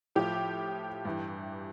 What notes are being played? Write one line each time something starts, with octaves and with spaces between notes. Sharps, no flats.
A2 F3 G4
G2 E3